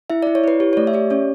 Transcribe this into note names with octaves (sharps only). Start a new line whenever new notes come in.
E4 E5
D5
E4
C#5
E4 B4
G4 C#5
C#5
A3 D5
E5
G4 D5
C#4 C#5